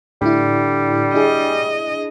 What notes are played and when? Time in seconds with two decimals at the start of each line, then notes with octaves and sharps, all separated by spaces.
0.22 A2 D3 G3 E4
1.14 D4 E4 G#4 D#5